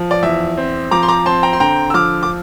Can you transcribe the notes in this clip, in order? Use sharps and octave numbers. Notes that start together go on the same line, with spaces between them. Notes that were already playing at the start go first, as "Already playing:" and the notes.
Already playing: F3
D5
E2 E5
C4
F3 A#5 D6
C6
A#5 D6
C4 A5 C6
G5 A#5
C6
D3 G5 A#5
E6
F3 D6 F6
D6